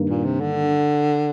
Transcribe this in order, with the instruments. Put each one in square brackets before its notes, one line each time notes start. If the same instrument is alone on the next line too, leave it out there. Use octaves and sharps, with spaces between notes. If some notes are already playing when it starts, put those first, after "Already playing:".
Already playing: [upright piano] G2 D#3 A#3
[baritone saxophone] A#2
C3
D3